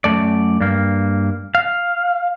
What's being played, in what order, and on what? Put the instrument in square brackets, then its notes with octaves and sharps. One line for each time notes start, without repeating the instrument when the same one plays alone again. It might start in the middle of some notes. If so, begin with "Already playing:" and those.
[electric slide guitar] F#2 C3 A3 D5
G2 A#3
F5